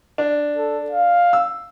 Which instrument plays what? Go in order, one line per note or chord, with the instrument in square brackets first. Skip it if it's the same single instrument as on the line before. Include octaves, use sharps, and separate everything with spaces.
[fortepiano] D4
[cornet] A4
F5
[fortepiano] E6